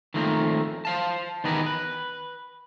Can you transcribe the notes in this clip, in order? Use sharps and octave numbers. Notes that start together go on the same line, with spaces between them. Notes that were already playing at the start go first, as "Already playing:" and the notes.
D#3 F3 A3 A#3 C4 A#4
C5 F5 A5
D#3 E3 B3 G4 G#4 A#4
B4